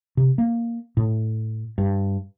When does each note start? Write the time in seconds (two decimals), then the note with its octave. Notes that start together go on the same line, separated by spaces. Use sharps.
0.17 C3
0.38 A#3
0.97 A2
1.78 G2